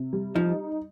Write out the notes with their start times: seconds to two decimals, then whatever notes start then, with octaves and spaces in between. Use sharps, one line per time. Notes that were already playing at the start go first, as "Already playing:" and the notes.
Already playing: C3
0.13 G3
0.35 F3 D#4